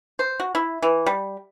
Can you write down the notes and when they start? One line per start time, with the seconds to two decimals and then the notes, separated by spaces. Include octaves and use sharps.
0.19 C5
0.40 F#4
0.55 E4
0.82 E3
1.06 G3